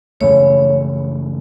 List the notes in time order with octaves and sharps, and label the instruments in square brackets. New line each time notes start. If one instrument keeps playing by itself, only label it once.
[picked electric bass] F#2 C#3 E3 A3 [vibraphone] C#5